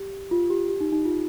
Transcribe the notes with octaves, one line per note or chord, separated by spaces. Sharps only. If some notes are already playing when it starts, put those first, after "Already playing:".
Already playing: G4
F4
G4
G4
D#4
D#4
F4